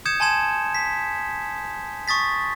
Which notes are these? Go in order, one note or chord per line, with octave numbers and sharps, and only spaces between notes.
D#6 G6 G#6 C#7 E7
G#5 A5 C6 G#6 E7
B6
C#6 D#6 A6 B6